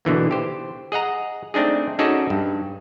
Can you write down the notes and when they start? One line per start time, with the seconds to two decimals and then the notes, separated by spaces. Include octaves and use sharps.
0.05 B2 D3 E3 A#3
0.31 G4 C5
0.92 G#4 D#5 F#5 A#5
1.54 A3 C4 D4 D#4 G#4
1.99 C#4 D#4 F#4 G#4 A4 D5
2.30 G2